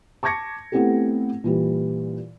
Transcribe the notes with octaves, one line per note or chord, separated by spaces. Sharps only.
A5 C#6 D6 G#6 A#6 C#7
A3 B3 C4 E4 G4 A4
A#2 E3 G3